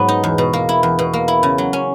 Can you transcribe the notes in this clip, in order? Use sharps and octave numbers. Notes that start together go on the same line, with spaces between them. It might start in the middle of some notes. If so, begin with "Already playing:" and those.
Already playing: G#2 F#3 B3
D#4
E2
B2
A#3
E4
E2
B2
A#3
E4
C#3
F#3
C#4